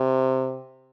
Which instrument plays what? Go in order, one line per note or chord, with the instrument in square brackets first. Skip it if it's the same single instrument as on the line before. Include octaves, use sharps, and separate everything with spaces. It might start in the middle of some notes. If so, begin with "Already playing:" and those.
Already playing: [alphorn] C3